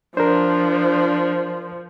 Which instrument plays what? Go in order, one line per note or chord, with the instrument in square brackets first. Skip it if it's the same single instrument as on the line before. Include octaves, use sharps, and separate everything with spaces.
[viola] F3 [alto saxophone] D4 [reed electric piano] A#4 C5